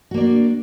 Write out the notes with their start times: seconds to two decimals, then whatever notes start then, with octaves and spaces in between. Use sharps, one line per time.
0.11 F#4
0.14 A#3
0.17 D5
0.20 D4